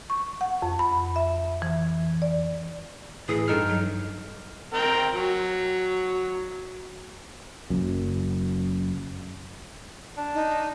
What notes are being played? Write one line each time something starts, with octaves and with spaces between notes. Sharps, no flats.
C#6
F#5
F2
B5
E5
E3
D5
A2 E3 G#4 D#6
G2 D#4 A4 F6
F#3
C4 A#4 G5
F#3
F#1 F#2
D4
D#4